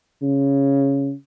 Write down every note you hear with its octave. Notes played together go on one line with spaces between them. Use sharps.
C#3